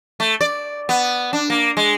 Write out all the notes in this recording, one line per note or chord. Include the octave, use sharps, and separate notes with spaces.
A3
D5
B3
D4
A#3
G#3